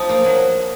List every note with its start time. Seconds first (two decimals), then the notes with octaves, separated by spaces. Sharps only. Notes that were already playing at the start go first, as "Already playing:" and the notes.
Already playing: F3 D#4
0.09 A#3
0.24 F#3